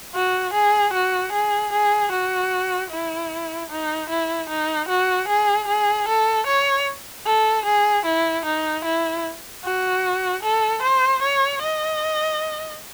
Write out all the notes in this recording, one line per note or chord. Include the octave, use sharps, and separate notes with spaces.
F#4
G#4
F#4
G#4
G#4
F#4
E4
D#4
E4
D#4
F#4
G#4
G#4
A4
C#5
A4
G#4
E4
D#4
E4
F#4
A4
C5
C#5
D#5